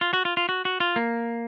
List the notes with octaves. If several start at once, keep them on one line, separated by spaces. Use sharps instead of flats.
F4
F#4
F4
F4
F#4
F#4
F4
A#3